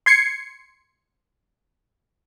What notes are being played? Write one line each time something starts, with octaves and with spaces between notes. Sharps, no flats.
C6 G#6 C7 C#7